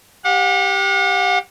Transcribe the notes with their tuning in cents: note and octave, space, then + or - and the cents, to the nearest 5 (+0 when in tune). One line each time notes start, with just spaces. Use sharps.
G4 +0 F#5 -40